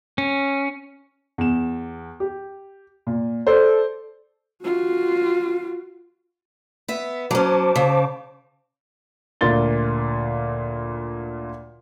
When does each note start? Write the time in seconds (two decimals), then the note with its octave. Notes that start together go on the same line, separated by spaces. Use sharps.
0.18 C#4
1.38 E2 E7
2.20 G4
3.07 A#2
3.47 A4 C5 D5
4.63 F4 F#4
6.88 B3 E5
7.31 F#3 C#4 C5 A5 D6
7.76 C#3
9.41 D2 A#2 A#3 F4 A6 G7